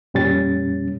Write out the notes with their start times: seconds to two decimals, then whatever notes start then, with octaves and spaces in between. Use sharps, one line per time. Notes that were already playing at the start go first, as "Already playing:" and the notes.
0.14 F2 A#2 G3 C#4 A6